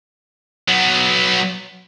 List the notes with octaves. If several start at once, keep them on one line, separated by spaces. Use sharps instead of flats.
F#3 B3